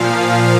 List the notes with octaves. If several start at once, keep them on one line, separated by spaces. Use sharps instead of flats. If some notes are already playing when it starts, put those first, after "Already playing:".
Already playing: A#2 F3 F5